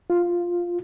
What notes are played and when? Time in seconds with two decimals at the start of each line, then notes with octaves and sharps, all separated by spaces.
0.10 F4